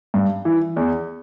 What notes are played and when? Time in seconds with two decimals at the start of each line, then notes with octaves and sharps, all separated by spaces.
0.14 G2
0.45 E3
0.76 E2